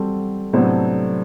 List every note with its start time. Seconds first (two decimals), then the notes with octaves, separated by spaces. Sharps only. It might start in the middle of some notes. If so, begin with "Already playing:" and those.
Already playing: G3 C4 F#4 A4
0.53 A2 C3 F#3 B3 D4 A4 C5